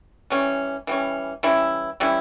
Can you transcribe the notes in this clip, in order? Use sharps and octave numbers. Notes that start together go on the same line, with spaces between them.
E3 G3 C#4
E3 G3 C#4
E3 G3 C#4 E4
E3 G3 C#4 E4